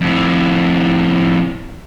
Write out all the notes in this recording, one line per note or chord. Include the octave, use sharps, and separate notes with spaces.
F2 A2